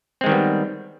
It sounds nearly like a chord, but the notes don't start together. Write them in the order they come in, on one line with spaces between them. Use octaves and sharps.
C4 G#3 D#3 G3 B3